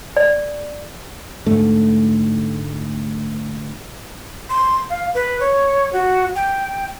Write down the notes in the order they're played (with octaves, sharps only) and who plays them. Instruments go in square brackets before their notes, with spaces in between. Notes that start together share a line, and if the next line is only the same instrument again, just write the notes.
[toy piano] D5
[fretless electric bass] D2 G#2 A3
[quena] C6
F5
B4
C#5
F#4
G5